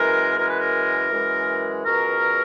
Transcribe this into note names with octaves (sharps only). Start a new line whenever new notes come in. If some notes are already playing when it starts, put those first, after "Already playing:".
Already playing: F#2 E3 G#3 A#4
F#2 E3 G#3 A#4
B4
A#4
F#2 E3 G#3
C#2 B2 F#3 A#4